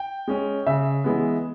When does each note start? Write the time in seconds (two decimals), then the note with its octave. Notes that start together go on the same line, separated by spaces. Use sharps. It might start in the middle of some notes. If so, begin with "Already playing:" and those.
Already playing: G5
0.28 G#3 C#4
0.66 C#3 E5
1.04 E3 G#3 B3